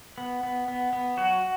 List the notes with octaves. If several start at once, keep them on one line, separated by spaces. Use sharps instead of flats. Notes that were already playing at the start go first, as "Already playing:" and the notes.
B3
B3
B3
B3
F#3 F#4